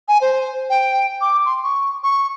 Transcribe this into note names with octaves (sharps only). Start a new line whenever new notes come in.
G#5
C5
G5
D6
C6
C#6
C#6